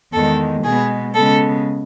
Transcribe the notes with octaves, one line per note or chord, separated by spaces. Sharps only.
E2 D#3 G#3 A4
B2 G#3 B3 G#4
C#3 G#3 B3 A4